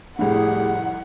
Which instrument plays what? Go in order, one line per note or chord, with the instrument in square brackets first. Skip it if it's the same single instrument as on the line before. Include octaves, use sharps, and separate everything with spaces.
[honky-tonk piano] F1 C2 [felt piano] A2 [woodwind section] G4 G#4 [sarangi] F#5